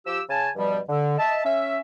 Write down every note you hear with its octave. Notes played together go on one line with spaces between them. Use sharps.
F3 G4 E6
C#3 G#5 A5
G2 B2 F3 G3
D3
D#5 E5 A5
C#4 E5